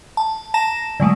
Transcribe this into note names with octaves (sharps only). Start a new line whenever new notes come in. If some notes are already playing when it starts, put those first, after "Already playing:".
A5
A5 A#5 A#6 E7
D3 F#3 G#3 A3